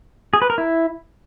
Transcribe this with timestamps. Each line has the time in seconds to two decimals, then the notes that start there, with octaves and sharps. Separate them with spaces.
0.34 G#4
0.42 B4
0.50 A#4
0.58 E4